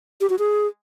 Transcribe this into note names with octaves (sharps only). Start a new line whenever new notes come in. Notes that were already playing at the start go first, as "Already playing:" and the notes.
G4
F#4
G#4